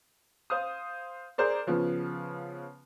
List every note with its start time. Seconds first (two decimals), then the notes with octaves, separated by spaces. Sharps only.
0.50 C5 F5 D#6
1.38 G#4 A#4 C5 D5
1.67 C#3 F3 B3